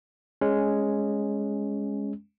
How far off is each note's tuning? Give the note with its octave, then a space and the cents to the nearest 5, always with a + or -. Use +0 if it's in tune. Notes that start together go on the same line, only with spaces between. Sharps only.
G#3 +0 C#4 +0